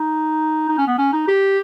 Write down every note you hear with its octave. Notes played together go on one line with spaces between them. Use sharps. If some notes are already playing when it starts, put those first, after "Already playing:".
Already playing: D#4
D#4
C#4
B3
C#4
D#4
G4